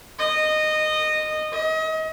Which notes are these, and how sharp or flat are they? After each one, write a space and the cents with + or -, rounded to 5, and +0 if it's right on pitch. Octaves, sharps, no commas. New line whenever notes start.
D#5 -15
D#5 +35